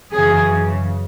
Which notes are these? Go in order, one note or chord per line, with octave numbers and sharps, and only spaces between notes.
F#2 C#3 E3 G#4